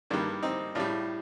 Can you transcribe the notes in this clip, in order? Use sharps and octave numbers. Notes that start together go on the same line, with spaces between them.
G2 D#3 G3 A#3 D4
C4 D#4
A2 G3 D4 F4